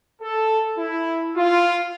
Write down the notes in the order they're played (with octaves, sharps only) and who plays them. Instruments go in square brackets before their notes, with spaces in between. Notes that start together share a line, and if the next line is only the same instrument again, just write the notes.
[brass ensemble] A4
E4
F4